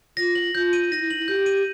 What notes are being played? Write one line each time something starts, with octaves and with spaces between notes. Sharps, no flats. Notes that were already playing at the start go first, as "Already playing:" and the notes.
F4 A#6
F#7
F4 G6
D#7
D#4 A#6
E4
D#4 F#7
E4
G4 G6
D#7